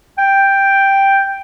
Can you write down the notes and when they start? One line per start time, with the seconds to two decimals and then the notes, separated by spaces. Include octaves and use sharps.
0.18 G5